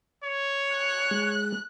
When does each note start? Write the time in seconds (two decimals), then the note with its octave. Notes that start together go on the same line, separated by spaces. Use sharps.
0.24 C#5
0.74 F#6
1.11 G#3